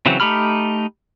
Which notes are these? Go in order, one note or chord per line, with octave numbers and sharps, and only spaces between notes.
C#3 E3 F#3 C4
A3 D#4 G4 B5 F6